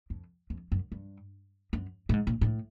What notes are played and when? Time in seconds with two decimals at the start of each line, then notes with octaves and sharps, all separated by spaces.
0.10 F2
0.50 F2
0.72 F#2
0.92 G2
1.73 F#2
2.09 A2
2.13 G#2
2.27 A#2
2.41 A2